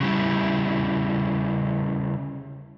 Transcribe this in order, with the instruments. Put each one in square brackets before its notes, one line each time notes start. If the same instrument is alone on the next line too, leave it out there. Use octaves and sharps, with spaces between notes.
[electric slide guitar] C#3 G3 E4